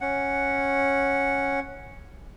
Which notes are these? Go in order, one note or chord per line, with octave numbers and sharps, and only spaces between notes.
C#4 F#5